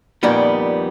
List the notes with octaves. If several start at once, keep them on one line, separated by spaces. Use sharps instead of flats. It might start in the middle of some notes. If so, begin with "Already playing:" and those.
F2 A#2 D#3 G3 B3